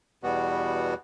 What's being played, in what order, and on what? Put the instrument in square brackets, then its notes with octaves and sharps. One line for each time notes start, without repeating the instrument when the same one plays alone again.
[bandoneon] E2 B2 G3 B3 F#4